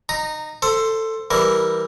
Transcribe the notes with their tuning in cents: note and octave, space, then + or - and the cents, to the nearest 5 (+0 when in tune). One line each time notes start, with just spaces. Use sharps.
D#4 -20 A#5 +0
A4 +15 C5 +0
E3 +0 G3 +0 A#4 +0